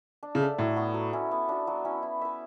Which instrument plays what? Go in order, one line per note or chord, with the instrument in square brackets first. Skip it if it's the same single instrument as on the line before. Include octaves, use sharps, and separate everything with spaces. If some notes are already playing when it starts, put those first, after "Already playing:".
[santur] D4
[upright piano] C#3
[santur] A4 E5
[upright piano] A2 [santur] F#3
[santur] B3 F#4
F#3
C#4 E4
B3
D4 F#4
F#3
C#4 E4
E4
B4 E5